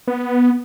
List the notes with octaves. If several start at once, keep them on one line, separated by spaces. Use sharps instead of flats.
B3